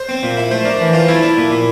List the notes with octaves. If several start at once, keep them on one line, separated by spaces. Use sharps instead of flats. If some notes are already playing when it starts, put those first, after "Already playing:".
Already playing: C5
C4
A#2
E4
A3 C5
D4 A#4
E3
F4 C5
A3 E4
D4
A#2
A#2